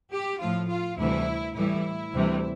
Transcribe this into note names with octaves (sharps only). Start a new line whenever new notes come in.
G4
A2 F3 F4
F4
D2 C3 E3 G3 E4
A2 E3 G3 E4
D2 C3 E3 G3